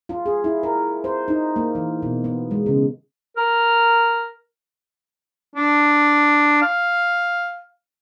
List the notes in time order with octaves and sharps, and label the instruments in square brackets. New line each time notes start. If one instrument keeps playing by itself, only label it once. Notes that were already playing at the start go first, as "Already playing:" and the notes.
[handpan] F4
G#4
E4
A#4
C5
D#4
A#3
E3
B2
B3
G#3
C#3
[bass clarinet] A#4
[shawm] D4
F5